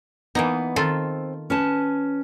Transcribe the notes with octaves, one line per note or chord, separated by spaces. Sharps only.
E3 A#3 B3 D#4
D#3 C4 F4 A4
C#4 B4 A5